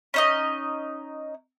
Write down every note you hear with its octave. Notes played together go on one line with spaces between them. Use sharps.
C#4 D#4 D#5